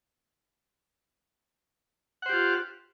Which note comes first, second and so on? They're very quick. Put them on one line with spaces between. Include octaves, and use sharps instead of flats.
F#5 C5 G4 F4